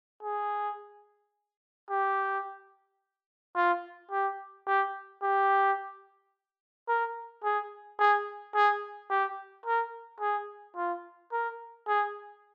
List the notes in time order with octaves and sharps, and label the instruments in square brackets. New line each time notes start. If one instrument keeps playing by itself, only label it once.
[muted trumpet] G#4
G4
F4
G4
G4
G4
A#4
G#4
G#4
G#4
G4
A#4
G#4
F4
A#4
G#4